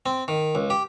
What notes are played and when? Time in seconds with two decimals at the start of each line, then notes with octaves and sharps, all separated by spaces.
0.06 C4
0.28 D#3
0.55 C#2
0.70 G4